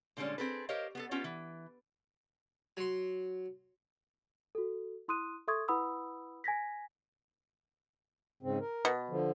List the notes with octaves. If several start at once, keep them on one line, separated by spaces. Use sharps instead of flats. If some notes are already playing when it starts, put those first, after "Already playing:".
A#2 D3 G3 G#3 C#4
C4 G#4 A4 B4
G4 A#4 C5 C#5 D#5 F5
B3 G#4 A4
B3 C#4 F4 G4
E3
F#3 C6
F#4 A4
E4 C6 D#6 F#6 D#7
A4 E5 C6 C#6 D#6 G#6
E4 B4 F#5 B5 D#6 E6
G#5 G#6 A#6 B6
G#2 C#3 C4
A#4
B2
D3 F3